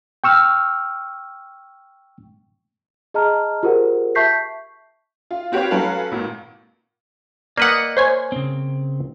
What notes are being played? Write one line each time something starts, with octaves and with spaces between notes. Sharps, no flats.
G5 C#6 E6 F6
G#4 D#5 A5 A#5 F6
F4 G4 G#4 A#4 C5 F#5
E5 A5 C#6 G6 B6 C7
F4
C4 F#4 G4 B4 C#5 F5
F#3 C#4 F#4 A4 B4 F5
G#1 A#2
A#3 B4 D5 D#5 F#5
C5 C#5 G#5
C#3 C4